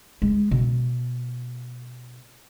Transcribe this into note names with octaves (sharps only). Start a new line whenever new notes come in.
G#3
B2